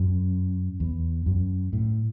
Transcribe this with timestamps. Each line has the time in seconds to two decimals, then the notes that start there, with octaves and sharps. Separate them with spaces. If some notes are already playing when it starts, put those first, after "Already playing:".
Already playing: F#2
0.80 E2
1.26 F#2
1.73 A2